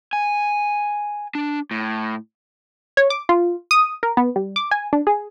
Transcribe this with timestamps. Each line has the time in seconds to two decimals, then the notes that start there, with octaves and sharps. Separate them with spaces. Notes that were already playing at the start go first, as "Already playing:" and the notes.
0.13 G#5
1.35 D4
1.71 A2
2.97 C#5
3.10 D6
3.29 F4
3.71 D#6
4.03 A#4
4.17 B3
4.36 G3
4.56 D6
4.71 G#5
4.93 D4
5.07 G#4